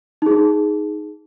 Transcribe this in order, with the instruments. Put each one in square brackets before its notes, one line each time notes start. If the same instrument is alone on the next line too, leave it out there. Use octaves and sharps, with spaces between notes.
[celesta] D#4 G#4